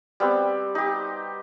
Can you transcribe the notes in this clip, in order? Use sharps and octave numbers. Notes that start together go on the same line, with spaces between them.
G3 B3 C4 G4
D#4 G4